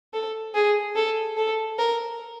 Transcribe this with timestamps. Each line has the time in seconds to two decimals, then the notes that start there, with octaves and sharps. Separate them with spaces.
0.13 A4
0.54 G#4
0.96 A4
1.37 A4
1.79 A#4